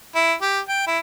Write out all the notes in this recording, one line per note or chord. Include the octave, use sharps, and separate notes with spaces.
E4
G4
G5
E4